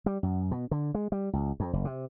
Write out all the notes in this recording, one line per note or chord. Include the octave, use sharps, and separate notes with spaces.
G3
F#2
B2
D3
G#3
G3
C#2
F2
F#1
C3